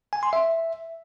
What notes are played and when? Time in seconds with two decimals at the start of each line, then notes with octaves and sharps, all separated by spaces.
0.13 G#5
0.23 C6
0.33 E5